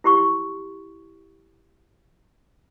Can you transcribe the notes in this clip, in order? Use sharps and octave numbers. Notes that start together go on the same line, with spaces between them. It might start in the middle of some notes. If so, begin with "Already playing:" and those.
E4 G4 C6 C#6